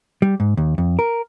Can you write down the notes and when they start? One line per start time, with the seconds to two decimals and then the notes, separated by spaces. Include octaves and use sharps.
0.22 G3
0.40 G#2
0.57 D#2
0.78 F2
0.99 A#4